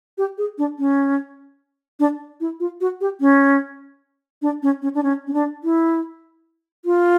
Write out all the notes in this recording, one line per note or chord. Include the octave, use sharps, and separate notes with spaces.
G4
G#4
D4
C#4
D4
E4
F4
F#4
G4
C#4
D4
C#4
C#4
D4
C#4
C#4
D4
E4
F4